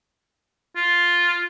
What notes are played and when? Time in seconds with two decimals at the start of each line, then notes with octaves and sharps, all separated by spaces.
0.76 F4